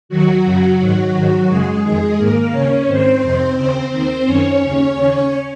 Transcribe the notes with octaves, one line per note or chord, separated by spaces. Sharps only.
D#2 D#3 F#3 F#4
F#2 C#3
G#2 D#3
G#2 D#3
F#2 C#3 G#3 G#4
F2 D#3 G#3 G#4
G#2 D#3 A#3 A#4
D#2 C#3 C#4 C#5
G#2 D#3 C4 C5
F2 C3 D#3
D#2 C#3 C4 C5
D#2 D#3 C4 C5
F#2 D#3 C#4 C#5
D#2 C#3
D#2 C#3